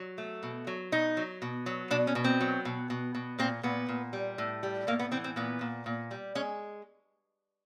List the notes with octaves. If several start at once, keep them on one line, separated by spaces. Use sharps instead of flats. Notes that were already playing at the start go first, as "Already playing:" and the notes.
Already playing: F#3
A3
B2
F#3
B2 D#4
F#3
B2
F#3
B2 D4
C#4
B2
C4
F#3
B2
B2
B2
A#2 C4
A#2 B3
A#2
G3
A2
G3
A2 A#3
B3
E3 C4
C4
A#2 B3
A#2
A#2
G3
G#3 C#4